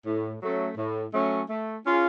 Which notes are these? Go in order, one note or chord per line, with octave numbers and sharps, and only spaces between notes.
A2
F#3 A3 C#4
A2
F#3 A3 C#4
A3
C#4 F4 G#4